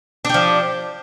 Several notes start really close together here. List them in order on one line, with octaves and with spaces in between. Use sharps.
D4 G4 F3